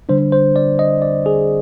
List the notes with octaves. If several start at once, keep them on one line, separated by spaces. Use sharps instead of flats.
D3 G3 D4 C5
C5
D5
D#5
D5
G#4